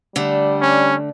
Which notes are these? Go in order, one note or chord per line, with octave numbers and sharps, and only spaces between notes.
D3 G3 A3
C#4